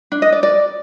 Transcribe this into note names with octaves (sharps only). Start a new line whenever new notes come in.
D4
D#5
D5
D5